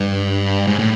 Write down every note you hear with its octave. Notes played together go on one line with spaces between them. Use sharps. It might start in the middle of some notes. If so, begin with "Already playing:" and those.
Already playing: G2
G#2
A2